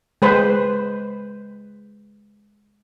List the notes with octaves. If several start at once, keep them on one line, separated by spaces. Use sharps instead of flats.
G#3 B4 C5